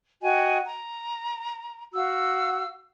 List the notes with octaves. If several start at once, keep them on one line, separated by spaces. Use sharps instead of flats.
F#4 D#5 G5 G#5
A#5
F#4 F5 E6